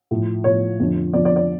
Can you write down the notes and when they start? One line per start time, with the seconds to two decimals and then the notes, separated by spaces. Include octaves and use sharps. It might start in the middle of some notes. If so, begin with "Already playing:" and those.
0.11 A2 F3
0.44 A2 F3 C#5
0.79 F2 D3 F3
1.13 F2 D3 F3 D5
1.25 D5
1.36 D5